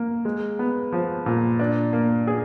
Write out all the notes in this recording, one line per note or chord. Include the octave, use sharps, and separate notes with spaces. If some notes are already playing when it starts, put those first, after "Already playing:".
Already playing: A#3
G#3
B3
F3
A#2
D4
A#3
G#4